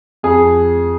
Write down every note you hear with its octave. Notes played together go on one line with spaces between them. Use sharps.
F2 G#4